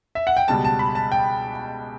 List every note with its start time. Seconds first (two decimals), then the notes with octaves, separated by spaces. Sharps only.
0.15 E5
0.27 F#5
0.37 G5
0.48 C#2 B2 G3 A5
0.65 A5
0.79 B5
0.95 A5
1.12 G5